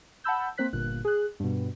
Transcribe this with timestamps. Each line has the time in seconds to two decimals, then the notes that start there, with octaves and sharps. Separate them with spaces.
0.24 F#5 A5 B5 E6 G6
0.58 A#3 C4 C5 F#6 B6
0.73 G1 A#2 F#6
1.05 G#4 F#6
1.40 G2 B2